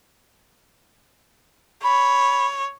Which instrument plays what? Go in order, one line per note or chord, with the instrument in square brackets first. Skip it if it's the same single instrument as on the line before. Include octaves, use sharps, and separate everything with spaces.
[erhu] C#5 [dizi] B5